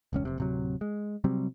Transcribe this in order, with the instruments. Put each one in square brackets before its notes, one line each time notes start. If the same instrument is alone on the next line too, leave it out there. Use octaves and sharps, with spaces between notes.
[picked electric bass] E1 C#2 C#4
F1 C3
D1 C3 F#3
G#3
C3 F#3 G3 C4